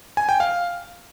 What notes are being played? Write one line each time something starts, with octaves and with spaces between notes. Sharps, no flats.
G#5
G5
F5